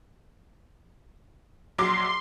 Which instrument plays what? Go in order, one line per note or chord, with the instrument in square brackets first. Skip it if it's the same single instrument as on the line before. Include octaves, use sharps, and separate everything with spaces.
[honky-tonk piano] A#1 F#3 D6 [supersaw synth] C6